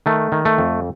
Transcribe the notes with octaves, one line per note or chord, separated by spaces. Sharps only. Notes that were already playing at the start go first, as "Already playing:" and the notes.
D#3 A3
D#3
A3
F2